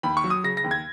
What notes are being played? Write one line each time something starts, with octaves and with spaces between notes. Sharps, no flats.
D#2 B5
C#6
F#3
D#6
C#3 A#6
A#6
D#2
G#6